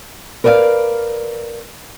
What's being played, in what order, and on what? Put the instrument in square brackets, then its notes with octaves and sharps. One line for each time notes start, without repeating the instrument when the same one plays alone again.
[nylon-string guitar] A#4 B4 D5 E5 F5